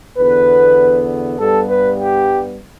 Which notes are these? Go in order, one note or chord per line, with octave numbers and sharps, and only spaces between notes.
E2 D3 B3 B4
G2 G3 B3 A4
B4
G4